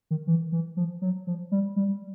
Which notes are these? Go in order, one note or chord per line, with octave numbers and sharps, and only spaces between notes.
D#3
E3
E3
F3
F#3
F3
G3
G3